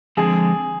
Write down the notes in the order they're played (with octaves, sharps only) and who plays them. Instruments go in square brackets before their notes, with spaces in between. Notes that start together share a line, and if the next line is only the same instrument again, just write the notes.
[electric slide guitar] D3 F3 G#3 C4 [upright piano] G#4